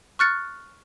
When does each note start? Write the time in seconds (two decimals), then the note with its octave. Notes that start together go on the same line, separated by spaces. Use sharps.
0.19 C#6 F6 F#6 A6 C#7